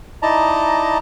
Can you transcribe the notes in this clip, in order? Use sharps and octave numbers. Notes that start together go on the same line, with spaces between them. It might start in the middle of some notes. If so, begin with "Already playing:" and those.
D#4 E4 D5 D#5 A5 A#5